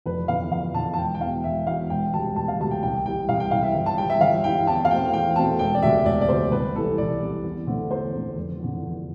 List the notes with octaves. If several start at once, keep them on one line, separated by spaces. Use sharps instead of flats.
F1 B4
E2 D3 F5
F1 F5
E2 D3 A5
A5
E1 G5
G5
E2 B2 F5
E1 E5
E2 B2 F5
E1 G5
D2 C3 G3 A5
E1 A5
F5
D2 C3 G3 A5
G5
C2 G5
C3 E3 G3 G5
C2 F5
G5
C3 E3 G3 F5
E5
G1
A5
G2 E3 G5
E5
G1 F5
G2 E3 G5
E2 A5
F5
B2 A3 C4 G5
E2 G5
B2 A3 C4 A5
E1 G5
D5
D2 C3 E5
E1 D5
D5
D2 C3 C5
C2 B4
C3 E3 A4
C2 D5
C3 E3
E2
D3 A3 C4
E2 C5
D3 A3 C4
F1
E2 D3
F1